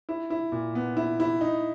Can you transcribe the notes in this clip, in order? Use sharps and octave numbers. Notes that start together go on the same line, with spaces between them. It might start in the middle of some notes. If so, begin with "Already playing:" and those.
E4
E4
A#2
B3
E4
E4
D#4